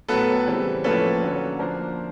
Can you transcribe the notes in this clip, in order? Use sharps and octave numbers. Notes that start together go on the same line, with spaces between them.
A2 F#3 B3 A4 B4
C#3 E3 G3 C4
A2 F3 A#3 C#4 A4 B4
D3 F#3 A#3 C#4
F3 A#3 D4 A#4 C5